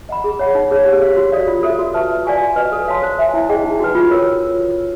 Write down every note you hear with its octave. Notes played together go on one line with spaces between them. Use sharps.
D#5 F#5 B5
G#4
C#5 F#5 B5
D#4
G#4 C#5
G4
C5 F5
F#4
A4 D5 F5
F4
A4 C5 E5
F#4
B4 E5 A5 C#6
B4
D5 F5 G#5 C#6
F#4
B4 D#5
A4
C#5 F5 A5 C6
C5
E5 G#5
E4
G#4 C5 D#5 G5
D#4
F#4 B4
F4
A#4 C#5